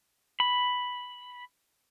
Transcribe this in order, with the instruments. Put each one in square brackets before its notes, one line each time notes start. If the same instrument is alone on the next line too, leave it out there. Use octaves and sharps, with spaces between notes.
[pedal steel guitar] B5